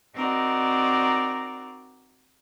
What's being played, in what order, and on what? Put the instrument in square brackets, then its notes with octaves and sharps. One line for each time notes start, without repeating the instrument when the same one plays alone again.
[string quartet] C4 D#4 F#4 A#4 D5